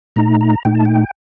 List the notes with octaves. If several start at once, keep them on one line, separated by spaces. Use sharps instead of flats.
A#2 A3 D#4 A#5
A#5
A#2 A3 D#4 G5
A5
G5